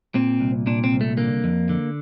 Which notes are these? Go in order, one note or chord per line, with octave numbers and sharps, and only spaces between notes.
A#2 C4
C2
A#2 D4
C4
C2
A3
D3 A#3
F2
D3